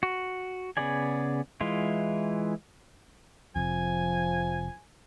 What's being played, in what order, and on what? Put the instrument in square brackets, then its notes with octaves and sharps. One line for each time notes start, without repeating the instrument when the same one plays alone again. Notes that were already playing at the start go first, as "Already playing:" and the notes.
[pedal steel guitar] F#4
C#3 B3 G#4 D5 G#5
E3 G#3 E4 F4
[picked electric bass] F1 F2 [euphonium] F3 [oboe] G#5